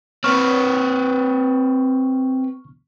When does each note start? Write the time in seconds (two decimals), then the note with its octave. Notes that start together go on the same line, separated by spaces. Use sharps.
0.24 C4 B4 C#6 F6